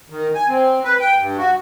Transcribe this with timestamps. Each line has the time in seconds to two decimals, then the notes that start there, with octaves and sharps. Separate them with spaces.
0.10 D#3
0.35 G#5
0.48 C4
0.84 B4
1.00 G5
1.18 G2
1.37 F#4